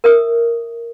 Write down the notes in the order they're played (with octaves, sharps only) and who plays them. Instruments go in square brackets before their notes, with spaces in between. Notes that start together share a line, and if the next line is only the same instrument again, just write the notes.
[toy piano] A#4 E5 D#6